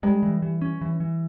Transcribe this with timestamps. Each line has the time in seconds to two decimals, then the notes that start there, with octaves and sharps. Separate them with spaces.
0.03 G3 G#3
0.23 E3
0.42 E3
0.62 C#4
0.81 E3
1.00 E3